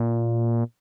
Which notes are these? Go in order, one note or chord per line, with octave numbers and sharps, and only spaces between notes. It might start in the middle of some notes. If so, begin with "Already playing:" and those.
Already playing: A#2